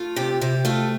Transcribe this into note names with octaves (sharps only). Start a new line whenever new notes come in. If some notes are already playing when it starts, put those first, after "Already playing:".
Already playing: A3 F4
C3 G4
C3 G4
A3 F4 A4